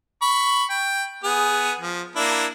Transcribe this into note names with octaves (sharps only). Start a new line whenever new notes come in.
B5 C#6
G5
B3 G#4
F3
A#3 D4 E4